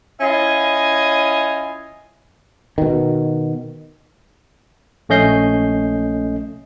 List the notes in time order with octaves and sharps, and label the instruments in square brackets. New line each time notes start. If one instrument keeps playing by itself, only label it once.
[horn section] C#4 E4 F4 D#5 G#5
[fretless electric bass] B2 D#3
[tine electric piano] A#1 A3 C#4 D#5 G6 C7